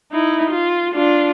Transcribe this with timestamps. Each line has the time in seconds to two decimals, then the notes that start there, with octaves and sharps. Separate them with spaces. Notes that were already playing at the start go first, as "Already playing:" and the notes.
0.12 D#4 E4
0.51 F4
0.94 D4 F4